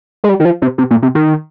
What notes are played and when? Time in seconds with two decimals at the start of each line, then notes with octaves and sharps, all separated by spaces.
0.24 G#3
0.29 G3
0.40 D#3
0.45 F3
0.62 C3
0.78 C3
0.91 A#2
1.02 C3
1.15 D#3